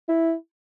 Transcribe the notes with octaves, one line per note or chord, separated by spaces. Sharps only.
E4